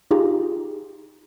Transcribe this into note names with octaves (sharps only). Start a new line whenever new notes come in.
D#4 F4 G4 G#4 A#5